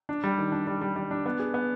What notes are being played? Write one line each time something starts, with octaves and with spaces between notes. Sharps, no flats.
D4
G3
D#3
D4
G3
G3
G3
D4
B3
G#4
B3